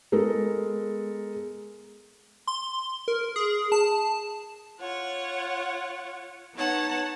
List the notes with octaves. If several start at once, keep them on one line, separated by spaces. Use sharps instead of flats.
G#3 B3 A4 A#4
C6
A#4
G#4
A5
F4 C#5 F#5
B3 D#4 C#5 F#5 A5